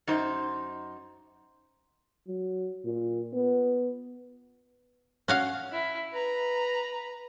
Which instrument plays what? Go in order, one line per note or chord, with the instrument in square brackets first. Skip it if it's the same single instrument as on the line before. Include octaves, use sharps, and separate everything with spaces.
[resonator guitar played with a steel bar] F#2 D#4 C5
[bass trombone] F#3
A#2
B3
[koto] C#4 F#4 F5
[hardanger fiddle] E4
B4 A#5